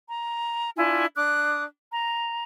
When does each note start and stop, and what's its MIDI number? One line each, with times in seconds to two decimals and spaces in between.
0.10 0.69 82
0.76 1.05 62
0.76 1.05 64
0.76 1.05 65
0.76 1.05 80
1.15 1.63 62
1.15 1.63 86
1.15 1.63 87
1.15 1.63 90
1.90 2.43 82